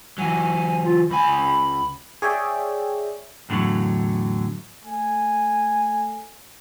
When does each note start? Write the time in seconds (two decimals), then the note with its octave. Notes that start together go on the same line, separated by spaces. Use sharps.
0.18 E3 F#3 G#5
0.85 F4
1.10 C#2 G#5 B5
2.22 G#4 C#5 D5 E5 G5
3.49 E2 A2 D3 D#3 F#3
4.84 A3 G#5